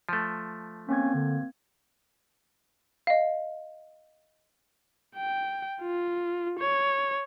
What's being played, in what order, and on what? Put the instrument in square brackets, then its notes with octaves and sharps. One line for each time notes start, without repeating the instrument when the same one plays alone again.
[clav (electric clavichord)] F3 A3
[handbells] A#3 C4 G#6 [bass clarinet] C#4
[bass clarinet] D3
[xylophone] D#5 F5
[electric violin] G5
F4
C#5